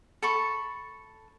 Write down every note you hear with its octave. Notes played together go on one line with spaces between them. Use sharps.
A4 B5 C#6